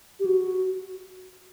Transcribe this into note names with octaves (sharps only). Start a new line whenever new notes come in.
G4
F#4